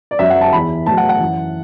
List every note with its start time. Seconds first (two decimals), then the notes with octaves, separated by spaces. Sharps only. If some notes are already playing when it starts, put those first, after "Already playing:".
0.11 D5
0.19 F#2 F#3 E5
0.30 F#5
0.41 A5
0.53 E2 E3 B5
0.86 A2 F#3 A5
0.97 F#5
1.09 F#5
1.20 F#2 E3